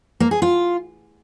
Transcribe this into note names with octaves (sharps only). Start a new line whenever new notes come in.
A#3
G#4
F4